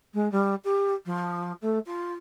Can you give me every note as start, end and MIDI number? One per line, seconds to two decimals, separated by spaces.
0.14 0.31 56
0.32 0.55 55
0.64 0.94 67
1.06 1.52 53
1.62 1.79 57
1.86 2.13 65